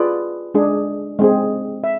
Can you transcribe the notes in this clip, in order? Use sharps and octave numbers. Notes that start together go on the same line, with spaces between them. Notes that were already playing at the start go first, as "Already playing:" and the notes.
Already playing: F4 G#4 B4 D5
G#3 D4 G#4
G#3 C4 G#4
E5